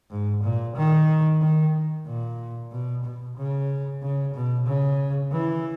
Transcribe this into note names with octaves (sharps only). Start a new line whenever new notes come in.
G#2
A#2
D#3
D#3
A#2
B2
B2
C#3
C#3
B2
C#3
E3